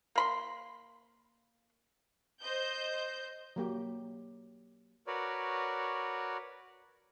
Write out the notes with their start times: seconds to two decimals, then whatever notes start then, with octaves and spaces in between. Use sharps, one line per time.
0.15 A#3 B5 C6
2.41 C5 D#5 G6
3.56 F#3 A#3 G4
5.07 F#4 A#4 B4 C#5 D5